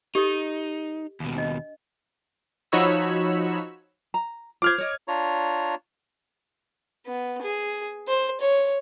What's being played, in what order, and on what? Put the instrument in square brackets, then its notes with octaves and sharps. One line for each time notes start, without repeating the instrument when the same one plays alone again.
[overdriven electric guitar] D#4 [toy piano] G4 A4 D#5
[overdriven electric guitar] D#2 B2
[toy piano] D4 D#5
[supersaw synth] F3 D#4 F#4 C#5 B5 E6
[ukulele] A#5
[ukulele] F4 C5 [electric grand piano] D6 F6 G#6
[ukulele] C#5 D#5
[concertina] D4 F4 C#5 A#5
[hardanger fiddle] B3
G#4
C5
C#5